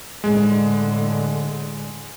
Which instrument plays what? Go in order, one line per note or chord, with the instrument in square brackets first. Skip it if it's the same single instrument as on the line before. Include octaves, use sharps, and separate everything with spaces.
[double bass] A2 D3 [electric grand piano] G#3